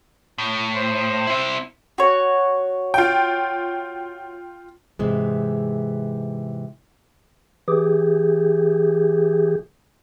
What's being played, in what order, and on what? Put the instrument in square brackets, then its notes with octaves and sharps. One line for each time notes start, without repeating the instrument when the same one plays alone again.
[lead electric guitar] A2
[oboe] C5
[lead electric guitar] C4 E4
[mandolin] F#4 C#5
[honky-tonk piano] F4 G5
[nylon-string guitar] G#2 C3 E3 G#3
[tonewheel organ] E3 G4 G#4